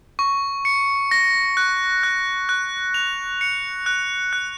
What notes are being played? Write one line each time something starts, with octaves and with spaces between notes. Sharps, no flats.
C#6
C#7
A#6
F#6
F#6
F#6
F7
C#7
F#6
F#6